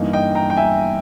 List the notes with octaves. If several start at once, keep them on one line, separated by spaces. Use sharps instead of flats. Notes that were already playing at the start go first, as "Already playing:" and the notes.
Already playing: G2 E3 A#3 D#4
D#5 G5
G5 A#5
G5
E5 G#5